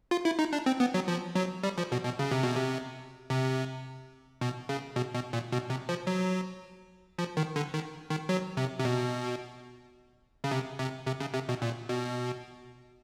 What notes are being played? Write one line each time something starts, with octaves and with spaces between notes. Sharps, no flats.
F4
E4
D#4
D4
C4
B3
F#3
F3
F#3
G3
F3
B2
B2
C#3
C3
B2
C3
C3
B2
C#3
B2
B2
A#2
B2
C3
F3
F#3
F3
D#3
D3
D#3
D#3
F#3
C3
C3
B2
C#3
C3
C3
C3
C#3
C3
B2
A#2
B2